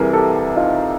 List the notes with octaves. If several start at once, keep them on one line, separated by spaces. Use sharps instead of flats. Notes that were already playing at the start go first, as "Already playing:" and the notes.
Already playing: C2 C3 E3 G#4 A#4
G4 A4
D#4 F4